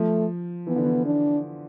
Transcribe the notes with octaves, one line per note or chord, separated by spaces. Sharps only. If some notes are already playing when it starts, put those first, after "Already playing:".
Already playing: F3 A3
E3 B3
D3
E3
D4